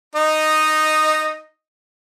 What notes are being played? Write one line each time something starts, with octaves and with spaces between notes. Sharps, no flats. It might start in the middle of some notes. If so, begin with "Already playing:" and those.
D#4 D#5